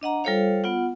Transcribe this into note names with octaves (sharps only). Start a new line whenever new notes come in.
D4 D#5 F#5 A#5
G3 F4 A4 C5 C#5 F5
B3 F4 F#5